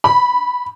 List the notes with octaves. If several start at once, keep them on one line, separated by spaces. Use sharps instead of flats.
B5